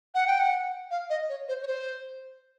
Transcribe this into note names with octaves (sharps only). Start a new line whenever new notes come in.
F#5
G5
F#5
F5
D#5
C#5
C5
C#5
C5